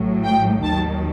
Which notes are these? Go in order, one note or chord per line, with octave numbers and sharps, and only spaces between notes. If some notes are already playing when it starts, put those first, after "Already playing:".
Already playing: A1 A2 F#3
G5
D#2 D#3 F#3 A5